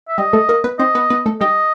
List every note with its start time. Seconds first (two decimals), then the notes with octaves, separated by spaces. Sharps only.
0.08 E5
0.18 G3 G4 D#5
0.33 A3 A4
0.49 A#3 A#4
0.64 B3 B4
0.79 C4 C5 D#5
0.95 B3 B4
1.10 B3 B4
1.26 A3 A4
1.41 G3 G4 D#5